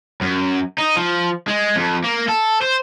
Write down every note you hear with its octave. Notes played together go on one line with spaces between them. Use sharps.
F#2
D#4
F3
G#3
F2
A#3
A4
C5